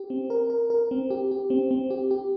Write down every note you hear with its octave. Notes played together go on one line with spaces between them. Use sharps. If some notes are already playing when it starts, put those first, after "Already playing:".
Already playing: G4
C4
A#4
A#4
A#4
C4
G4
G4
C4
C4
G4
G4